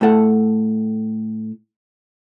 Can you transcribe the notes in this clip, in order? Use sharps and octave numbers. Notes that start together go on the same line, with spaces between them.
A2 A3 A4 F#5